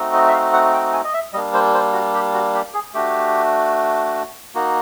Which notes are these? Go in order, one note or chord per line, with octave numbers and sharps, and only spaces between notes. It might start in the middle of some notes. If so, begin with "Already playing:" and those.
Already playing: A3 C4 D#4 F#4
D#5
E5
F5
F#5
G5
G#5
D#5
E5
G3 A#3 D4 D#5
C5
C5
F#4
G4
F#4
G4
G#4
A3 D4 F#4 G4
A#3 D#4 F#4